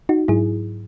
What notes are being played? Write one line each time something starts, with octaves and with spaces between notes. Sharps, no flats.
D#4 F#4
G#2 F#3 E4 G#4